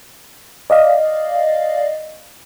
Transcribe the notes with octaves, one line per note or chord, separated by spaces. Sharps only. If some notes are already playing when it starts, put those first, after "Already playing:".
D5 D#5 F5